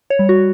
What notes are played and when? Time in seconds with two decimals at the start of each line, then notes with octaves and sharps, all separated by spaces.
0.10 C#5
0.19 G3
0.29 F#4